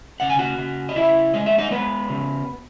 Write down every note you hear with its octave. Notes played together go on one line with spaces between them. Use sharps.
C#3 F#5
G#5
F#4 F#5
C#3
D#5
C#3 E4 E5
G#3 D#5
E5
D#4 D#5
G#3 B3 B4
C#3